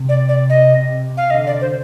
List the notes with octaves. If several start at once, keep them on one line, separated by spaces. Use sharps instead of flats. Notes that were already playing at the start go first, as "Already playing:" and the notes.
Already playing: C3
D5
D5
D#5
F5
D3 D#5
D5
C5